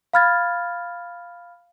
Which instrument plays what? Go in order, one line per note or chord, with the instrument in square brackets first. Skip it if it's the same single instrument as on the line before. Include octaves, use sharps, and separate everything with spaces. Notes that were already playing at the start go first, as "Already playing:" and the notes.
[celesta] F5 B5 F6 G#6 A6